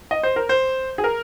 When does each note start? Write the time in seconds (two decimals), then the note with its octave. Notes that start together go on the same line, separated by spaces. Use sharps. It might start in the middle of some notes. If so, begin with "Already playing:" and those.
0.11 D#5
0.23 C5
0.36 A#4
0.49 C5
0.98 G#4
1.04 A#4